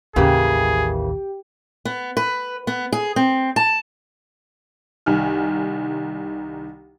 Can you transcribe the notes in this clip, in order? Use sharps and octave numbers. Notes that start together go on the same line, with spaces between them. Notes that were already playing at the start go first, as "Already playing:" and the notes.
A1 D#2 C#3 E3 A#3 G4 G#4 G5
B3
B4
B3
G#4
C4
A5
C2 D#3 G#5 F6